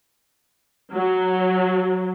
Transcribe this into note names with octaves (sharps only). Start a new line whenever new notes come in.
F#3